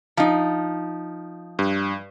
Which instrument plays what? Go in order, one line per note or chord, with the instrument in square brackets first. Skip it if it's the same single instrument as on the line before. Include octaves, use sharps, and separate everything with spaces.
[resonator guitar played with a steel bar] F3 D#4
[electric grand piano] G2